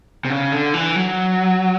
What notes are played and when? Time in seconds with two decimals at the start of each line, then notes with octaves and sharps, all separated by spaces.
0.25 C3
0.30 C#3
0.52 D3
0.74 E3
0.96 F#3